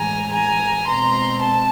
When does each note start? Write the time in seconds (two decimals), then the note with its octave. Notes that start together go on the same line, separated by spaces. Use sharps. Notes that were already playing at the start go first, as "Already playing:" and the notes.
Already playing: A2 E3 G#3 G#5 A#5
0.32 G#5 A#5
0.87 B2 G#3 C4 A#5 C6
1.41 A5